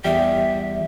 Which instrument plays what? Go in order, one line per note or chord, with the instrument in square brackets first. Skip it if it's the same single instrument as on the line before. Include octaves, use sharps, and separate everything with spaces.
[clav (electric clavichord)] E2 G3 G5 [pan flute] E5